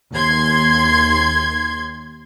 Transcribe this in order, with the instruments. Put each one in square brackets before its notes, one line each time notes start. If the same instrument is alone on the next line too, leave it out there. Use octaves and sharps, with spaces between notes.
[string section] D#2 C6 G#6